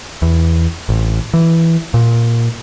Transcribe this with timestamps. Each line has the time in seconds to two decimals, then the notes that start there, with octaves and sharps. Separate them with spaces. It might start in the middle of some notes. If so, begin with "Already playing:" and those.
0.22 E2
0.89 A1
1.34 E3
1.94 A#2